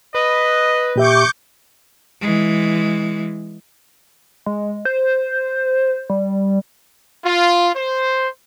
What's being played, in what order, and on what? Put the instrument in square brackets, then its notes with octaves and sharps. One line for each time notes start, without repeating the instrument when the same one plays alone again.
[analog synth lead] B4 [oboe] D#5
[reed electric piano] A#2 G4 E5 [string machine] C#6 D6 G6
[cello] E3 G#3
[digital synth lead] G#3
C5
G3
[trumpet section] F4
C5